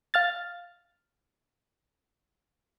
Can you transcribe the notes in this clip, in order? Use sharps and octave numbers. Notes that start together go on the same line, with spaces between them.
F5 F6 A6